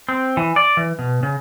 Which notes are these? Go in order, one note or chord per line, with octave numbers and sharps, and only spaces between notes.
C4
E3
D5
E3
B2
C#3